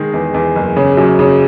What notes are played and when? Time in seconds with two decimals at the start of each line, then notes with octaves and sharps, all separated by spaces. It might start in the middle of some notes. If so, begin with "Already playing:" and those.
Already playing: D#3 G#3 D#4
0.13 E2
0.34 E2
0.56 F#1
0.77 C#3
0.97 F#2
1.19 C#3